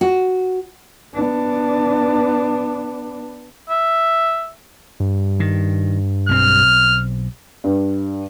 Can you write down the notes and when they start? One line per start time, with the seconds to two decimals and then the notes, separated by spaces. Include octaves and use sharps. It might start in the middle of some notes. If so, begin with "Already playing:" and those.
0.01 F#4
1.14 B3 D4
3.69 E5
5.00 G2
5.40 D#3
6.29 B1 C4 F6
7.64 G2